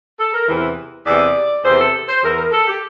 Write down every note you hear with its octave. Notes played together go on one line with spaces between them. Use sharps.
A4
A#4
E2 C3 E3
E2 C3 E3 D5
E2 C3 E3 C5
A4
C5
E2 E3 A#4
A#4
A4
G4